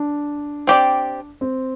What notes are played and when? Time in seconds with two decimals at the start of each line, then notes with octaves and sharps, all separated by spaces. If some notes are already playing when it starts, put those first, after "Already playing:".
Already playing: D4
0.67 C4 G4 D5
1.41 C4